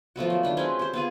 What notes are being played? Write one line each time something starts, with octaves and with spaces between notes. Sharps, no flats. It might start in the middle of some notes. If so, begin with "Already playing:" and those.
F3 A3 B3 F#4
F#3
D#3 D4 B5
G#3 C4 C#4 B4
G4 C5
B3 F4 G#4